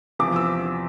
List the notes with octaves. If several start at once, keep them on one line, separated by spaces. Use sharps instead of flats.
E2 C3 F3 D6
E6